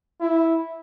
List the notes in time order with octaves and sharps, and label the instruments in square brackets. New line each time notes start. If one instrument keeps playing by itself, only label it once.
[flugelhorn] E4